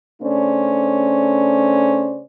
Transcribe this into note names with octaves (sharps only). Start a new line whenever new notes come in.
C#3 A3 C#4 D4 C5 D5